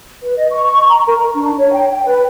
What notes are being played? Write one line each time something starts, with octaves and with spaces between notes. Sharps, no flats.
B4
D#5
C#6
C#6
A#5
A#4
A#5
D4
C#5
G5
G5
B4